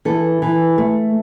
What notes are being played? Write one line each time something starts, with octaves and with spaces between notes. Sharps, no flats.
E3 A4
E3
A3